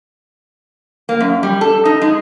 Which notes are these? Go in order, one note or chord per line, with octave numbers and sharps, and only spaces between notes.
A#3
F#2
G3
A4
D#4
G#3